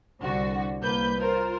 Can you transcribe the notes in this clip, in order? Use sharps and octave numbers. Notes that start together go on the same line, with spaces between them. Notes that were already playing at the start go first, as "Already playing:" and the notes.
C2 D3 F#4
C2 A#3 B4 G6
F4 A#4 C5